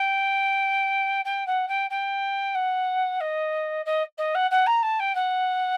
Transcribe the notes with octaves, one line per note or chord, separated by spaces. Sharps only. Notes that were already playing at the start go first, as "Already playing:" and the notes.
Already playing: G5
G5
F#5
G5
G5
F#5
D#5
D#5
D#5
F#5
F#5
A#5
A5
G5
F#5